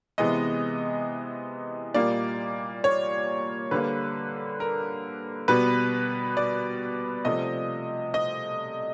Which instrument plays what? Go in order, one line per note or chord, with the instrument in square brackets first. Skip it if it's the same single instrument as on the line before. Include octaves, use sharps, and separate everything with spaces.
[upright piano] C3 E3 G#3 B3 D#5
A#2 G3 A#3 D5
C#5
D3 G3 A#3 B4
A#4
B2 G3 B3 B4
D5
C3 F3 A3 D#5
D#5